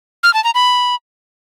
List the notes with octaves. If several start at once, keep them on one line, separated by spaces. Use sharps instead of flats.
F6
A5
A#5
B5